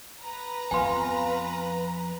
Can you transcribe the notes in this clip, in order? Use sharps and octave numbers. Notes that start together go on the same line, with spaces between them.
B4 A#5
F2 F3 B3 F5 G#5 C6